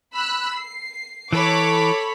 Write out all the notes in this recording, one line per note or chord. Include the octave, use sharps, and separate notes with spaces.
B5 E6 F#6
C7
E3 A4 C#5 B5 D6